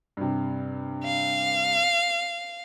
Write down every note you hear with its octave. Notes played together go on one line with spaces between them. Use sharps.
G2 C3
F5